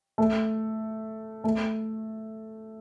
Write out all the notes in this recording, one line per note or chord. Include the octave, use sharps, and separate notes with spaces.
A3
A3